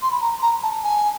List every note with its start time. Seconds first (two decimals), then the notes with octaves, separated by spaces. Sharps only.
0.02 C6
0.12 B5
0.21 A#5
0.42 A#5
0.63 A5
0.84 G#5